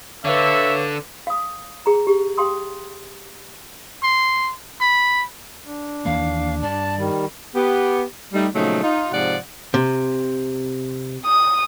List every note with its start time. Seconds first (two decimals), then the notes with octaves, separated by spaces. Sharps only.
0.25 D3 B4 C#5 E5 F5 D6
1.27 F5 D#6
1.86 G#4 A#5
2.07 G4
2.38 G4 F5 G5 C6 D#6
4.03 C6
4.81 B5
5.65 D4
6.05 D#2 E3 A#3 F5
6.62 G2 D5 A5
6.97 D#3 G3
7.55 B3 G4
8.33 G3 A3 D#4
8.55 A#2 C#3 F3 F#3 A3 D#4
8.84 D#4 F4
9.13 G#2 C3 F3 D5 F#5
9.74 C3
11.26 D#6